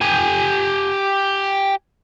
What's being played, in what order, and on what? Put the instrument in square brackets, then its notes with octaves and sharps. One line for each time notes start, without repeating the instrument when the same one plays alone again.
[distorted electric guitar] G4 G#5